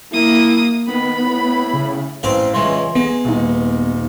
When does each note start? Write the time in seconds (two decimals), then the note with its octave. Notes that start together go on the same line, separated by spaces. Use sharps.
0.13 A#3 E4 D#6
0.88 D#3 B3 B5
1.23 A2
1.73 C#3
2.23 A1 C4 C5 F5
2.54 C#2 E3 G#3 C6
2.95 G#3 B3
3.25 D#1 D#4